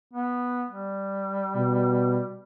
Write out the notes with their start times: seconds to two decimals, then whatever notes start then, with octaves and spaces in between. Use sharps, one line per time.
0.14 B3
0.70 G3
1.56 B2